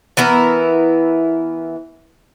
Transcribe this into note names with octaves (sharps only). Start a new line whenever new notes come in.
E3 B3 E4 A#4